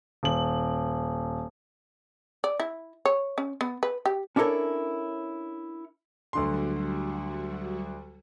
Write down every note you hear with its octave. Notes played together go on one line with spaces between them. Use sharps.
D#1 F#7
D5
E4
C#5
C#4
B3
B4
G4
C#4 D4 E4 A4 A#4 C#5
D2 D3 F#3 G3 F#4 C6